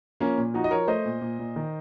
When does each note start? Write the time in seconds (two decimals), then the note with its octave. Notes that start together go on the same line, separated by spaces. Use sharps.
0.20 F3 A#3 C#4
0.38 A#2
0.54 F3 D#4 F#4
0.64 D#5
0.71 F3 A#4 C#5
0.88 A3 C5 D#5
1.05 A#2
1.21 A#2
1.39 A#2
1.56 D#3